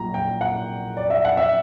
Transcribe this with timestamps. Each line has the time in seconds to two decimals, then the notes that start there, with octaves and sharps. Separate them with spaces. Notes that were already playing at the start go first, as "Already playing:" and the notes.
Already playing: A#1 A#2 F#3 A#5
0.14 G5
0.41 F#5
0.97 D5
1.10 E5
1.25 F#5
1.37 E5